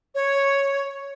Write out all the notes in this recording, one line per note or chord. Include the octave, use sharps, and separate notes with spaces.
C#5